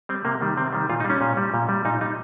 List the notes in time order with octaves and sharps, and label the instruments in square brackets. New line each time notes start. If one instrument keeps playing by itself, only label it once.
[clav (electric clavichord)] G3 C4
C3 A#3
D#3 G3
C3 C4
D#3 G3
A#2 F4
D#4
G3
C#4
A#2
G3
A#2
G3
A#2 D#4
G3 D#4